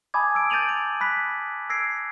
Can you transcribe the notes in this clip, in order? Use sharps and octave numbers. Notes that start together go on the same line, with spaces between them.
G#5 A5 B5 D6 D#6 G#6
E6 G#6 D7
G6 A6 D7 D#7 F7 F#7
D7
B5 F#6 B6
E6 G#6 A#6 C7 D7